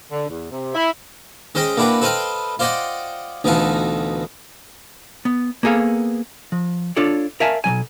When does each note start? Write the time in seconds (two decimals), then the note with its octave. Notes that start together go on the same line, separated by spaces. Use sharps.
0.11 D3
0.29 E2
0.50 C3
0.75 E4
1.55 G#3 C#4 C5 D#5 G5
1.77 A#3 D4 E4 F#4 G4 B4
2.02 A4 B4 C5 D#5 F5 G5
2.59 F4 C5 D5 D#5 F#5 G5
3.44 D2 B2 E3 D#4 F4 A4
5.25 B3
5.63 A#3 B3 G#4 A4 F5
6.52 F3
6.96 D4 F4 A4 C#5 D5
7.40 A#4 D5 E5 F5 G#5 A5
7.64 B1 E2 F#3 G#5